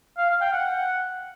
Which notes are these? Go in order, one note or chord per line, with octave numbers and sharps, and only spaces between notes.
F5
F5
G5
F#5